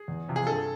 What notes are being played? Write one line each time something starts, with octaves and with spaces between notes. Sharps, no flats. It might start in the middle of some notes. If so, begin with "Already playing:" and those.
Already playing: G#4
E2
C3 F3
G#4
G2 A4